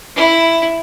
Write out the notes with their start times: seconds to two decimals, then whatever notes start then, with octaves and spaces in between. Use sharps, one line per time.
0.16 E4